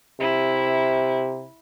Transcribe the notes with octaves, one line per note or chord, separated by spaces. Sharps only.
C3 E4